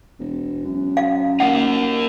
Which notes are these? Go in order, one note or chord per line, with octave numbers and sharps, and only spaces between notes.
E1
F#2
F5
A#3 D#4 F#5